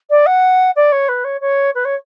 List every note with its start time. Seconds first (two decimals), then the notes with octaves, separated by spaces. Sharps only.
0.10 D5
0.26 F#5
0.76 D5
0.92 C#5
1.09 B4
1.24 C#5
1.41 C#5
1.75 B4
1.85 C#5